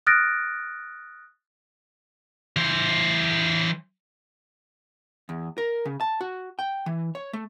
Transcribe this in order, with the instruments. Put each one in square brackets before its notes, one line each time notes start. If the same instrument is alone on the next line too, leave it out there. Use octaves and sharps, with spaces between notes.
[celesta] D#6 F6 F#6 A6 A#6 D7
[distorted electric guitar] E3 C5
[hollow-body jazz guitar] E2
A#4
C#3
A5
F#4
G5
E3
C#5
A3